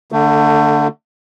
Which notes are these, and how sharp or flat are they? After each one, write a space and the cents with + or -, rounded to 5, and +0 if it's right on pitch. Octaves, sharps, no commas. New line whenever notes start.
D3 +0 A3 +25